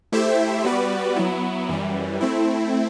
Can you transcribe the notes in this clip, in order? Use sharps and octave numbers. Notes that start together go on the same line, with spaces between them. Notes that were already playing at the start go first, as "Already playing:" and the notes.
A3 E4 G4 C5 E5
G3 B3 F#4 B4 D5
F#3 B3 E4
F#2 E3 G3
A3 C4 E4